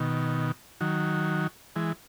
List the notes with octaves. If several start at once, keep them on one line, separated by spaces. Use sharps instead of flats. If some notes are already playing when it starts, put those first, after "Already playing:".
Already playing: B2 D#3
D#3 F#3
E3 G#3